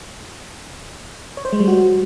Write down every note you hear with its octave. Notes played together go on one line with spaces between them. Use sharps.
C#5
C5
G#3
G3
F#4